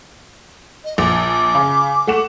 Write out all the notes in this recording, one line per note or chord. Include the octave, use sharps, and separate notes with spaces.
D#5
A#1 D6
C#3
A3 F#5 E7